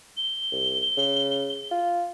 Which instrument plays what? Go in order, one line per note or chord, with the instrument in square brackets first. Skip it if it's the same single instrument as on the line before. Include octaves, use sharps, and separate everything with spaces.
[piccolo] G7
[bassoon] C2
C#3
F4